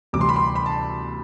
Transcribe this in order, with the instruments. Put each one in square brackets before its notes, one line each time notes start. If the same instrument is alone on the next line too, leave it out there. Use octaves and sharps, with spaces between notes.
[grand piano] D2 C3 E3 G3 D6
C6
B5
C6
B5
A5